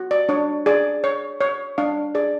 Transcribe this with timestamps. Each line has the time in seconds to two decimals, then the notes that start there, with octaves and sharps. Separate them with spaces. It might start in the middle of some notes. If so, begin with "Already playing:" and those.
Already playing: F#4
0.11 D5
0.29 D4 C#5
0.66 G#4 D5
1.04 C#5
1.41 C#5
1.78 D4 F5
2.15 G#4 D5